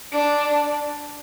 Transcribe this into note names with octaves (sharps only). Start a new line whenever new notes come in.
D4